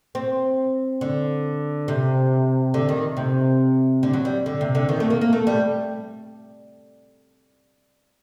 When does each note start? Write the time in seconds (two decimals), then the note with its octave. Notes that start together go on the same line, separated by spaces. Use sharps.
0.15 C4
1.01 D3
1.88 C3
2.74 D3
2.89 D#3
3.17 C3
4.03 D3
4.13 F#3
4.25 G3
4.46 D3
4.61 C3
4.75 D3
4.89 D#3
5.00 A3
5.10 A#3
5.21 A#3
5.33 A3
5.47 G3